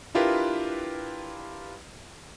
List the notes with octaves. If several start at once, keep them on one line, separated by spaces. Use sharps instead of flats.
D4 E4 F4 G4 A#4 B4